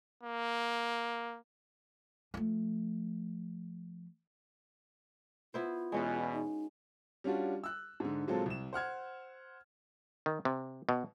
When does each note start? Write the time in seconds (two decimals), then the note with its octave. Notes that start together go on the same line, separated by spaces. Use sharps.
0.23 A#3
2.34 F3 A3
5.54 B3 E4 F4 C5
5.92 E2 B2 G#3 C#4 F#4
6.33 D#4
7.24 G3 C#4 D4 F4 F#4
7.64 E6 F#6
8.00 G#2 D3
8.27 A#2 F#3 G#3 C4 F4 A4
8.46 C2 E7
8.73 C5 F#5 F6 G#6
10.26 D#3
10.45 C3
10.89 B2